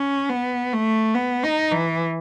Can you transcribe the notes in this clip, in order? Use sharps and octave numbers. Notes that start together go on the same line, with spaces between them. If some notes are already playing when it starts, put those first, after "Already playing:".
Already playing: C#4
B3
A3
B3
D#4
E3